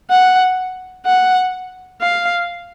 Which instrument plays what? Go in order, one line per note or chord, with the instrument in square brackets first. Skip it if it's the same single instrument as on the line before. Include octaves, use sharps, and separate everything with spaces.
[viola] F#5
F#5
F5